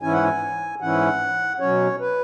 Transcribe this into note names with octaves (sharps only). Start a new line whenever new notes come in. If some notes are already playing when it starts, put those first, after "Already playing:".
G#2 E3 C#4 E4 G#5
F#5
G#5
G#2 E3 C#4 E4 F#5
B2 F#3 C#4 C#5
B4